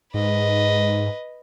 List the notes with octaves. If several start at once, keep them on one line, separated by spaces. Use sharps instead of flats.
G#2 B4 D#5